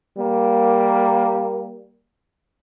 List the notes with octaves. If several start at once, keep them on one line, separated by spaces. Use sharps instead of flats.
G3 A#3